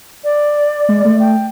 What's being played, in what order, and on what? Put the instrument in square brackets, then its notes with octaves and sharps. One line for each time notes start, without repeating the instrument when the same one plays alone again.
[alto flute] D5
[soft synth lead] G#3
A3
[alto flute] G5